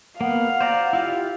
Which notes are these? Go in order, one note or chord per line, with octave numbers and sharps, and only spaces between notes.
A#3 B3 F5 F#5
C5 D5 A#5
E4 F4 G4